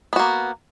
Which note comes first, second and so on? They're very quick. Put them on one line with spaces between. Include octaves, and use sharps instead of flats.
B3 F#4 A#3